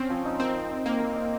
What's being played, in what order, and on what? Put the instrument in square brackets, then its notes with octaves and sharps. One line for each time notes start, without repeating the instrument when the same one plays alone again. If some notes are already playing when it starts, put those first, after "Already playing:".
Already playing: [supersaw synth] C4 C#4
[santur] F3
D#4
[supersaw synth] C4 [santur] A#4
[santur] D#4
D#4
[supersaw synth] A#3 [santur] A#4
[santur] A#4
D#4